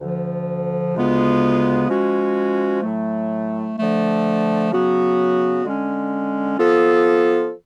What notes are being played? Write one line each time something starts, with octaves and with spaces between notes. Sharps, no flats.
D2 D3 F3
D2 C#3 G#3 B3 F4
F3 G#3 C#4 F#4
A2 F#3 A3
D3 F3 A3
C#3 F#3 B3 F#4
D3 G#3 C#4
F3 B3 F4 A4